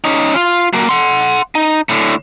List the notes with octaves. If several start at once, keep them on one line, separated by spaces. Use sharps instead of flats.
C#4 D#4
F4
F#3 A#3
F#5 C6
D#4
A2 D3